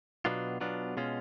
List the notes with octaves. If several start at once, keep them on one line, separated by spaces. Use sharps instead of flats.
B2 F#3 B3 D4 F4
B2 F#3 B3 D4 F4
B2 G#3 C#4 F4